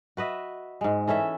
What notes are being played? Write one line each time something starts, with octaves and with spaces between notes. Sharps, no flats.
F#4 B4 D#5 E5
G#2 G#3
E3 C#4 A4 E5